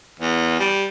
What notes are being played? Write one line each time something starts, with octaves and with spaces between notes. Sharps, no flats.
E2
G3